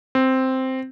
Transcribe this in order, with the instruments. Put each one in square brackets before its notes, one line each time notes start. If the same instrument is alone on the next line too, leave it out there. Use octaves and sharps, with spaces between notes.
[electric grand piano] C4